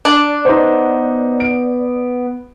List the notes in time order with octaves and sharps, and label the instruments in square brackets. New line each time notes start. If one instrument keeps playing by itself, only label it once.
[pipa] D4 [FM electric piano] D5
[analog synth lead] B3 [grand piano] D#4 C5
[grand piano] D7